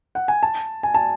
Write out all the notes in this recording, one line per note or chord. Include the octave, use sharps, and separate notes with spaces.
F#5
G#5
A5
G#5
A5